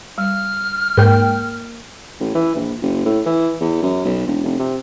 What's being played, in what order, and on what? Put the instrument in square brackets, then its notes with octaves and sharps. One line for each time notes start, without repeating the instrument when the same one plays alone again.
[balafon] G3 [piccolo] F6
[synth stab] G#2 G5 [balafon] A#3 A#4
[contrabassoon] A1
E3
A#1
F#1
A2
E3
E2
F#2
B1
E1
F1
C3